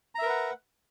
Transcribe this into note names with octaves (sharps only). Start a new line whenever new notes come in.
A#4 B4 E5 F#5 A#5